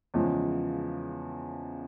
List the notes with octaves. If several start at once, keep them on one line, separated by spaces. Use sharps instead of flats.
E2 C#3 F3 G#3